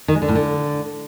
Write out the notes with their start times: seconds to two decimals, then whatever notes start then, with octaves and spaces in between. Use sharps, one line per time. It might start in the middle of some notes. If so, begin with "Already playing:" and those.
0.08 D#3
0.15 G#3
0.22 D3
0.28 A2
0.35 D3